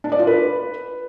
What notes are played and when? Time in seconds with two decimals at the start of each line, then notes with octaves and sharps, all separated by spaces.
0.04 D4
0.12 D5
0.19 F4
0.27 B4